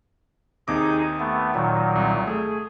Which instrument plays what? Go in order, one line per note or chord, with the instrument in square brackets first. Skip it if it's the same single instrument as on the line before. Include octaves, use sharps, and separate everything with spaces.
[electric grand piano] D#2 C3 D6 [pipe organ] D#4 G#4 D#5
[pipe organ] A3 B3
A#2 D#3 F#3
[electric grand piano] C2
[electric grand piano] A3 [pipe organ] G#4